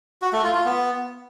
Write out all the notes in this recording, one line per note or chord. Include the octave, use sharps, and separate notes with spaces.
F#4
A3
F4
F4
B3